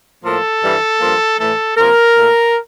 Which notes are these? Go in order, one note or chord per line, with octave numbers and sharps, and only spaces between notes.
A2 F3 A#3 A4
G2 E3 G3
G2 F3 A#3
A2 E3 A3 A4
C3 F3 A#3 A#4
A#2 A3